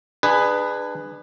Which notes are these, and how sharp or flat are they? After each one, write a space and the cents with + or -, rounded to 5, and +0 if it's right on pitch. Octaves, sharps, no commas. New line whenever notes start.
D4 +25 G#4 -10 B4 +10